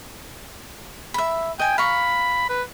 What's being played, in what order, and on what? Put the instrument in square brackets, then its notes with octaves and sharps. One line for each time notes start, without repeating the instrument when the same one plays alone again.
[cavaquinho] E5 B5
[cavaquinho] D#5 G#5 [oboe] G5
[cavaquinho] F5 A#5 C#6 [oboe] B5
[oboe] B4